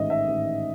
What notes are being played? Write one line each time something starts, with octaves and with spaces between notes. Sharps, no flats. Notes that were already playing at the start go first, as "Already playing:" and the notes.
Already playing: A1 G#2 D#3 D#5 E5
E5
A1